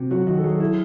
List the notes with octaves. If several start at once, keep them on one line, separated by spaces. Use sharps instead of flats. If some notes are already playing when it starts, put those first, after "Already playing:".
Already playing: C3 F#4
F#3 F#4
D#3 F#4
A4
F#3 G#4
E4 G#4